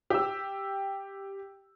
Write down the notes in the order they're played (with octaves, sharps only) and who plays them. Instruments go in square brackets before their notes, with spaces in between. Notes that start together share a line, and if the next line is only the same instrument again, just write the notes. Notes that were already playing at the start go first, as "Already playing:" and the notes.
[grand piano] G4 G5 E6